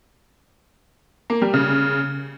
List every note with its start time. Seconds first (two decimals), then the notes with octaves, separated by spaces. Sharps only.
1.30 A#3
1.42 G3
1.54 C#3